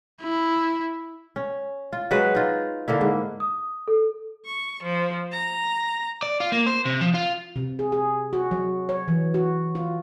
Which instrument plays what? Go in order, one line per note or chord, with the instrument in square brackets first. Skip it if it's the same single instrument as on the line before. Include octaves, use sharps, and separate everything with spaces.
[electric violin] E4
[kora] C#4
F4
F#3 G#3 B4
D#4 F4
D3 A#3 E4
G#2
[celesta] D#6
A4
[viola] C#6
F3
A#5
[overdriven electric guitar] D5
F4
A#3
C5
C3
F3
F4
[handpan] C3
G#4
G#4
F#4
F#3
C#5
E3
F#4
F4